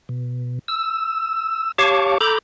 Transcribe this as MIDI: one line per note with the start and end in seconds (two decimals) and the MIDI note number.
0.09 0.59 47
0.68 1.72 88
1.78 2.18 67
1.78 2.18 73
1.78 2.18 77
1.78 2.18 81
1.78 2.18 85
1.78 2.18 86
2.21 2.38 69
2.21 2.38 82
2.21 2.38 83
2.21 2.38 86
2.21 2.38 91